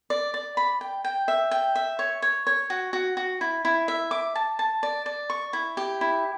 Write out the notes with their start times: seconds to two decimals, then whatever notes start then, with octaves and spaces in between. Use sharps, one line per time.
0.10 D5
0.34 D5
0.57 B5
0.81 G5
1.05 G5
1.28 E5
1.51 G5
1.76 E5
1.99 C#5
2.22 C#5
2.47 C#5
2.70 F#4
2.93 F#4
3.17 F#4
3.41 E4
3.65 E4
3.88 E5
4.11 D6
4.35 A5
4.59 A5
4.83 D5
5.06 D5
5.30 C#6
5.53 E4
5.77 G4
6.01 E4